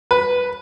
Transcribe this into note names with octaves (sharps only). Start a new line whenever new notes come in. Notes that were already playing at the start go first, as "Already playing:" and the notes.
B4